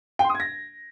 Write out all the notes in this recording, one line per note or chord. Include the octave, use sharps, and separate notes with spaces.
G5
C6
D#6
G#6
A#6